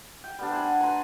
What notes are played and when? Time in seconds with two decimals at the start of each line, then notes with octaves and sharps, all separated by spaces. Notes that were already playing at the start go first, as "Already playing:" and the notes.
0.24 G5
0.39 G3 B3 D4
0.52 C5 F#5 G#5
0.80 B4 G#5 A#5 C6